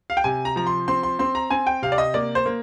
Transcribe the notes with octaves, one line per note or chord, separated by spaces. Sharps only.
F5
G5
C3 G#5
A#5
F3 A#5
C6
C4 C6
C6
C4 C6
A#5
C4 G#5
G5
C3 F5
D5
D#5
A#3 D5
C5
A#3